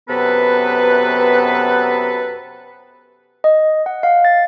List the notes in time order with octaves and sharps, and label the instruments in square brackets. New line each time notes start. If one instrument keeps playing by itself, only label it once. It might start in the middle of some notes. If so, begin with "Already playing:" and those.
[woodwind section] F#2 C3 B3 A4 B4
[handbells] D#5
F#5
F5
A6